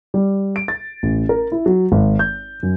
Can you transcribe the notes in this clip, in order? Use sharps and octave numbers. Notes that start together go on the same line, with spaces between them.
G3
D7
A6
A1
A#4
E4
F#3
G#1
G6
F#2